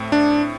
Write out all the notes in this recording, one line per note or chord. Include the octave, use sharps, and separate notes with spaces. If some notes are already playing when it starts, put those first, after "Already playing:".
Already playing: A2 A3 C4
D4